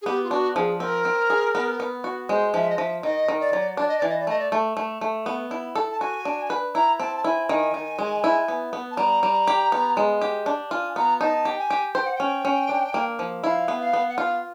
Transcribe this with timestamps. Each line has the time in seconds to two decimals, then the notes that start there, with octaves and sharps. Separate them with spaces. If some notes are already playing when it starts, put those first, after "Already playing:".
0.02 G#4
0.06 B3 G4
0.23 F4
0.31 D4 F#4
0.55 F3 G#4
0.80 C4 A#4
1.05 C4
1.30 G#4
1.55 B3
1.80 B3
2.04 F#4
2.29 G#3 C5
2.54 F3 E5
2.69 D#5
2.78 F3 E5
3.03 D#3 D#5
3.28 D#3
3.40 D5
3.53 F#3
3.77 D4 D5
3.88 D#5
3.98 E3 D5
4.08 D#5
4.19 D5
4.27 A3 D#5
4.39 D5
4.52 A3
4.77 A3
5.01 A3
5.26 B3
5.51 E4
5.76 A4
5.91 A5
6.00 F#4 G#5
6.25 D4
6.50 B4
6.75 E4 A#5
6.99 C4 A5
7.16 A5
7.24 E4 G#5
7.49 D#3 G#5
7.74 D#3
7.99 G#3
8.24 E4
8.48 B3
8.73 B3
8.91 A5
8.97 G3 A#5
9.23 G3
9.47 G4
9.72 B3
9.97 G#3
10.21 G4
10.46 D4
10.71 F4 G#5
10.96 B3 A#5
11.21 D#4 A5
11.45 G4 G5
11.58 G#5
11.70 G4
11.95 C5 G5
12.05 F#5
12.15 C#4 G5
12.45 C#4
12.69 D4
12.94 A#3
13.19 F3
13.44 E4 F5
13.68 B3
13.81 F5
13.93 B3
14.08 F#5
14.18 F4 F5